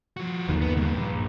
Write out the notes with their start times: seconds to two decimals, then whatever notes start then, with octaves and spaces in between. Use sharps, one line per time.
0.17 F3 F#4
0.48 G1 D#2 D#3
0.61 B3
0.76 D2 G2
0.94 A#1